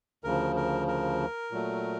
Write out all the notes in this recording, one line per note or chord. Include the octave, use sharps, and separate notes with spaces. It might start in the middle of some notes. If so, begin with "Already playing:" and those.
D2 C#3 F3 A#4
A#4
A#4
A#2 F#3 A3